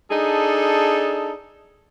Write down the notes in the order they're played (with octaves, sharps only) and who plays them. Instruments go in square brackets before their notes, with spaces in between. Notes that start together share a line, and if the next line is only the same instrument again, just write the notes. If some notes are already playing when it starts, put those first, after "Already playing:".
[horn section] D4 D#4 G#4 A4